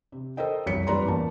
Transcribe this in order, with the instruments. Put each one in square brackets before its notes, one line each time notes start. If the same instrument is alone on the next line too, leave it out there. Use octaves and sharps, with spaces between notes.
[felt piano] C3
A4 A#4 C5 D#5 G5
F1 C2 F#2 C#5 B6 C#7
F2 G3 B4 D5 A#5 C6
A1 E2 A#3 A5